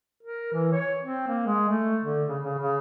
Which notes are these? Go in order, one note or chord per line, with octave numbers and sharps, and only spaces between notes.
A#4
E3
C#5
C4
A#3
G#3
A3
D3
C#3
C#3
C#3